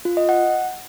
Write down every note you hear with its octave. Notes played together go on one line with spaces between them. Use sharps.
F4
D#5
F#5